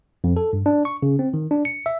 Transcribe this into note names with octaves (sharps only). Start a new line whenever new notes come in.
F2
A4
G2
D4
C#6
C#3
C4
D#3
D4
C#7
E5